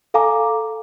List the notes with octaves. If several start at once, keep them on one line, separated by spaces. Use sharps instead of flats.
A4 F5 G#5 A#5 D6